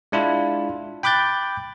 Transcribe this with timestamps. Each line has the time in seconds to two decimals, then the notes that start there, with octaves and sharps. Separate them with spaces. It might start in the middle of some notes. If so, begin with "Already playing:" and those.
0.12 G#3 D4 E4 F4
1.03 G5 B5 D6 F#6 G6 A6